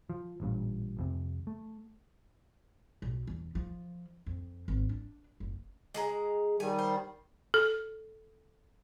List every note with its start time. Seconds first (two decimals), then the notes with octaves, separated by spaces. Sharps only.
0.10 F3
0.40 A1 G2 A#2
0.97 C2 F2 C3
1.47 A3
3.02 B1
3.27 E2
3.55 F3
4.26 F2
4.68 G#1
4.89 D4
5.40 F#1
5.94 G#3 G#4 A#5
6.60 D#3 G3 G#5
6.79 C5
7.54 A4